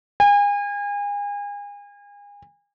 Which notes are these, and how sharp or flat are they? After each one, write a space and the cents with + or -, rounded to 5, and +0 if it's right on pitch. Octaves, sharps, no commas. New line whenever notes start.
G#5 -35